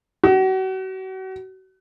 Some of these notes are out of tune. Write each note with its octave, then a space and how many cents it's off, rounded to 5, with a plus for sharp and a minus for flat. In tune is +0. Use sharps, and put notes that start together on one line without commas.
F#4 +35